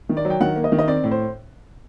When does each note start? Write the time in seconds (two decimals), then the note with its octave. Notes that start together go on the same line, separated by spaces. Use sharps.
0.09 D#3
0.17 D5
0.25 F#3
0.30 G5
0.40 D#3 F#5
0.56 A#3
0.64 D#5
0.72 D#3
0.79 D#5
0.88 C4 D5
1.04 A2
1.11 C5